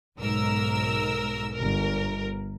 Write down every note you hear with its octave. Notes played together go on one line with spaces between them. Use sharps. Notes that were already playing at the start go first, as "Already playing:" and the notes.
B1 G#2 A#4 E6
G1 A#4